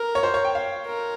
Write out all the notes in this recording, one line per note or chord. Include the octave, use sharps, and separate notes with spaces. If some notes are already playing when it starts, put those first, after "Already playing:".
Already playing: A#4
C#5
C5
C#5
G5
F5
A#4